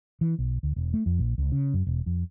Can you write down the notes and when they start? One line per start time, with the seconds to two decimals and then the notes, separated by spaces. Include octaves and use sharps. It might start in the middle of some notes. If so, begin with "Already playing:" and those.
0.21 E3
0.38 B1
0.63 D2
0.76 E1
0.94 A3
1.06 F2
1.19 A#1
1.38 C#2
1.52 C#3
1.74 F#2
1.87 E1
2.06 F2